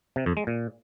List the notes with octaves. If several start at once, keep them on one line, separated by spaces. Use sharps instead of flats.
C3
F2
G#3
A#2